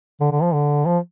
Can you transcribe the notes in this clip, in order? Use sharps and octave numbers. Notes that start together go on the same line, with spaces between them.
D3
D3
F3
D3
F3